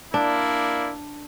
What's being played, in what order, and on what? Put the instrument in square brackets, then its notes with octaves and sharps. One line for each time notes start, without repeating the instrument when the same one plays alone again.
[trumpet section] A#3 E4 D5 [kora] D4